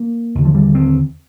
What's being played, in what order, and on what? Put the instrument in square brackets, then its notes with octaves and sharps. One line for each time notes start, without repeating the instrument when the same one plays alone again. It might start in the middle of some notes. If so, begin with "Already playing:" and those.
Already playing: [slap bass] A#3
D#2 D3
F3
G3
C4